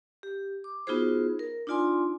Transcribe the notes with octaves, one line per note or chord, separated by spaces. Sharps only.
G4
D6
B3 D#4 F4 F#4 G#4 C5
A#4
D4 D#4 F4 D5 G#5 C6